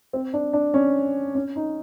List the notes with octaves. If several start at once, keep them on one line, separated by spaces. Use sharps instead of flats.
C4
D4
D4
C#4
C#4
D#4